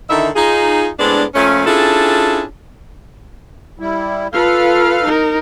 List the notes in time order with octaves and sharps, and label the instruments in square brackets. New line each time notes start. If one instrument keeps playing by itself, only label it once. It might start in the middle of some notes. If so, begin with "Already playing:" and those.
[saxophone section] D3 D#3 D#4 E4 E5
D#4 F4 G#4
A2 G#3 B3 C4 D4
A#2 F3 A3 C#4
C#4 D4 E4 F4 G#4 A4
[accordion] G3 E4
[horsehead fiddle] F4 B4 [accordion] A4 F5 F6
[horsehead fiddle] D#4 A#4